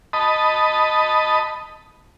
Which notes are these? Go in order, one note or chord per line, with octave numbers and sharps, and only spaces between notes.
D#5 A5 B5